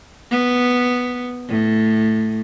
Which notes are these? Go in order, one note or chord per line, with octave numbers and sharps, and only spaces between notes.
B3
A2